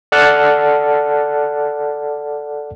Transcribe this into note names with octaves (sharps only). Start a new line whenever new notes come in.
A4 D5 F#5 A5 F6 F#6